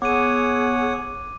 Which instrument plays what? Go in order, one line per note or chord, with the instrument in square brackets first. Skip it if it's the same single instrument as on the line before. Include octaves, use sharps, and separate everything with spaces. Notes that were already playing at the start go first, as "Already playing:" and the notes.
[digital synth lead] B3 [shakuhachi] G#4 [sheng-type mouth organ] C#5 F#5 [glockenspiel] D6 D#7